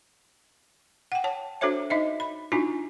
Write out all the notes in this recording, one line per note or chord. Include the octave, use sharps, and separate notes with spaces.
F#5 G5
C#5 A5
D4 F#4 A4 C5 C#5 E5
D#4 D#5 E5
B5
D4 D#4 F4 F#4 G#5